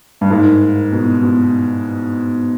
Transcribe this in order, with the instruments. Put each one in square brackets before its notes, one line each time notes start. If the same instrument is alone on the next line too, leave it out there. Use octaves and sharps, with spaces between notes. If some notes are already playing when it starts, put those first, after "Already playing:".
[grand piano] G2
[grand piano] G#2 [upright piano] A#3
[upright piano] A#3
B2
B2